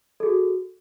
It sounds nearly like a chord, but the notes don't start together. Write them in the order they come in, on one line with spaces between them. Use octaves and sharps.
A4 G#4 F#4